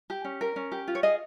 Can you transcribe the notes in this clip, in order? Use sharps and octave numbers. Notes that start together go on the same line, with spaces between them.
G4
C#4
A#4
C#4
G4
F4
C#5
G#4 D#5